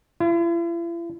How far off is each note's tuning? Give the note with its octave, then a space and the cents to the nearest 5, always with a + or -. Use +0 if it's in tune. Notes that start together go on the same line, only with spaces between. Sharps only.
E4 +45